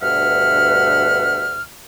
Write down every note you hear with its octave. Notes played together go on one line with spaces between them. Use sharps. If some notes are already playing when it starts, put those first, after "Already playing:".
D2 G2 B2 E5 F#5 F6